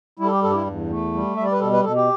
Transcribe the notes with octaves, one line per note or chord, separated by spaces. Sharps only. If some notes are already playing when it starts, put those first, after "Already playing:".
G3 E4
A4
G4
G2 A4
G4
E4
E2
A3
G3
G3 E5
D5
B4
B2 A4
B4
B2 A4
G4